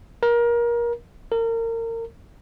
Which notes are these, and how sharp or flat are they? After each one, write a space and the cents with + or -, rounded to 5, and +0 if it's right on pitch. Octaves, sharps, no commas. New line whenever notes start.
A#4 +25
A#4 -30